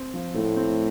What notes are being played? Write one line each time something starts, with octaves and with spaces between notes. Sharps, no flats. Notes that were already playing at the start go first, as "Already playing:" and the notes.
Already playing: C4
F3
A2 A3
C4